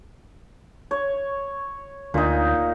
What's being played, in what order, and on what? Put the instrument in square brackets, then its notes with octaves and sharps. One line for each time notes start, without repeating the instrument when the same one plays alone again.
[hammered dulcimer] C#5
[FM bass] D2 [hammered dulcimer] A#2 D#4